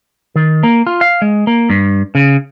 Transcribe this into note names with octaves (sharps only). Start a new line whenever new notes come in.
D#3
A#3
F4
F5
G#3
A#3
G2
C#3